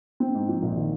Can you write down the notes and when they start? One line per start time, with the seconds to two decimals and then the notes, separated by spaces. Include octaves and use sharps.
0.20 C4
0.35 G#2
0.48 F3
0.63 A#1
0.76 D#3